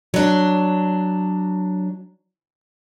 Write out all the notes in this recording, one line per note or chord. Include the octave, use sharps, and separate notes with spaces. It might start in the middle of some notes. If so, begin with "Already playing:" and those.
F#3 D4